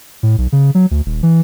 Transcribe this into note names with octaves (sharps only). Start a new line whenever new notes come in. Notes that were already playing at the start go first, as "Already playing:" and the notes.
A2
B1
C#3
F#3
D2
D#1
E3